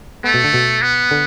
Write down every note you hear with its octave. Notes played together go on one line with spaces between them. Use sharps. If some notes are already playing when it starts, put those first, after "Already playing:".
A3 B3
B2
D3
B2
B3
D3